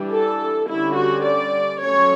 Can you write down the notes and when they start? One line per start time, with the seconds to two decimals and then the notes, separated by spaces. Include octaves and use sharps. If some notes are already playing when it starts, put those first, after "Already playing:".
Already playing: E3 G3 D4
0.12 A4
0.68 D3 G3 C#4 E4
0.97 F#4
1.24 D5
1.81 F#3 A3 C#4 C#5